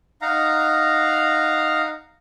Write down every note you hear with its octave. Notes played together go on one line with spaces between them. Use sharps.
D#4 F5 F#5 A#5